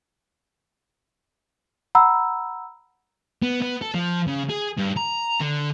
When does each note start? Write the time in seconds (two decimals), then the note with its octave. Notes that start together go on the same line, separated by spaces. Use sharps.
1.95 F#5 A#5 B5 E6
3.42 B3
3.62 B3
3.82 A4
3.94 F3
4.27 C#3
4.49 G#4
4.77 G2
4.96 A#5
5.40 D3